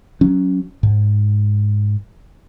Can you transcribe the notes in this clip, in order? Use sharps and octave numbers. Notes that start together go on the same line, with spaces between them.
F#3 C#4
G#2